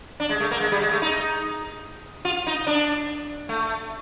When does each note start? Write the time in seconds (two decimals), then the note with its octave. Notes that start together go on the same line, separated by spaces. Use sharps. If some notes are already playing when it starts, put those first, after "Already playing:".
0.20 D4
0.29 G#3
0.40 A3
0.51 A#3
0.60 G#3
0.72 G3
0.81 G#3
0.91 A3
1.02 D#4
2.25 F4
2.46 D#4
2.67 D4
3.49 A3